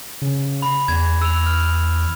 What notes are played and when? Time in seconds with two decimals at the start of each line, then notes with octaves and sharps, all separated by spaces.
0.22 C#3
0.62 B5
0.88 E2 G#6
1.22 E6 F7
1.46 F6